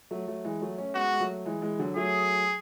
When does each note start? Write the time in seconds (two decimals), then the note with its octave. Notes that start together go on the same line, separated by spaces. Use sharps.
0.11 F#3 A3
0.28 F#3 A3
0.45 E3 G#3
0.62 F#3 A3
0.78 A3 C#4
0.95 G#3 B3 F#4
1.13 G#3
1.20 F#3 A3
1.46 E3 G#3
1.62 E3 G#3
1.79 D3 F#3
1.96 F#3 A3 G#4